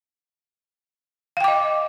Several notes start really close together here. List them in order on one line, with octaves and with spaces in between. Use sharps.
F5 G5 D6 D#5